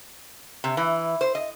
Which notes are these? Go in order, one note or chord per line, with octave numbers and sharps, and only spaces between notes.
C3
E3
C5
D#5